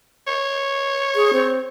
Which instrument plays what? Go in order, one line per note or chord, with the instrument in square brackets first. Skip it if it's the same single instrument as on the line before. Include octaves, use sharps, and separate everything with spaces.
[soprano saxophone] C#5
[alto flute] G#4
C4